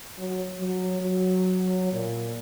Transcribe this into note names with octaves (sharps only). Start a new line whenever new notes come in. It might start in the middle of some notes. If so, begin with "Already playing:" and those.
F#3
F#3
F#3
A#2